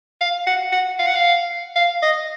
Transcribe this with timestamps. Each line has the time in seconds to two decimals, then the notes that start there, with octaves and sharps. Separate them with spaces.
0.21 F5
0.46 F#5
0.72 F#5
0.99 F5
1.06 F#5
1.15 F5
1.76 F5
2.02 D#5